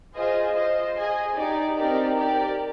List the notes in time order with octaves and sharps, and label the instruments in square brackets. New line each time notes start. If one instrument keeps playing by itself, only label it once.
[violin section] F4 G#4 C5 D#5 G#5
F4 C5 D#5
G#4 D#5 G#5
D#4 G4 D5
C4 D#4 G4 A#4 D5
G4 A#4 D5